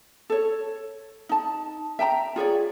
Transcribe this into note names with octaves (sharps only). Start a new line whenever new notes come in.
A4 C#5
D#4 A5
E5 G5 A5 A#5
F4 G#4 C#5 D5